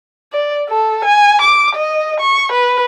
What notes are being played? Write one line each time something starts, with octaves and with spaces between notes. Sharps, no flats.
D5
A4
G#5
D6
D#5
C#6
B4